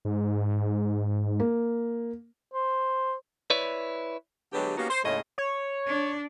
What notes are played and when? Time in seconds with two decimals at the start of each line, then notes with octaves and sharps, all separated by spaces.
0.05 G#2
1.40 A#3
2.54 C5
3.50 E4 B4 C#5 D5
4.53 D3 F#3 G#3 B3 G4
4.77 A#3 B3 C#4 D#4 F#4 G4
4.90 C5
5.04 D#2 A2 C#3 G#3 A3 D#5
5.38 C#5
5.87 D4